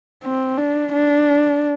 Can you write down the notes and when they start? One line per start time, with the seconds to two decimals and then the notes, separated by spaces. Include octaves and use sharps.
0.24 C4
0.57 D4
0.92 D4